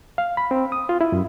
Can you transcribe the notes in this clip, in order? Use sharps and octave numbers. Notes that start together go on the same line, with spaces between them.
F5
B5
C4
D#6
F4
E4
F#2